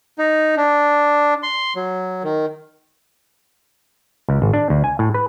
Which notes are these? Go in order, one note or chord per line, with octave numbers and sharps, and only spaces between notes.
D#4
D4
C6
F#3
D#3
C#2
G#1
D4
D2
G#5
A2
B4